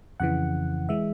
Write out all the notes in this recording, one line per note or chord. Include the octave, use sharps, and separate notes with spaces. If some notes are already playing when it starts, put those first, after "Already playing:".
F2 C#3 E3 F#5
E3 G#3 E5